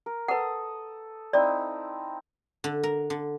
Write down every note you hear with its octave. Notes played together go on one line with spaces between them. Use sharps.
A#4
A4 B4 F#5 D#6
C4 D#4 E4 D5
D3
A#4
D3